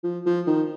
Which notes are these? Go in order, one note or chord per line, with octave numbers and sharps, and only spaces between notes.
F3
F3
D#3